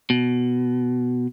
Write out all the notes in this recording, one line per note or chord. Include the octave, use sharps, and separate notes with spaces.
B2